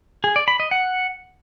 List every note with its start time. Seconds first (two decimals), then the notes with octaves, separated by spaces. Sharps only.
0.24 G#4
0.36 D5
0.48 B5
0.60 D#5
0.71 F#5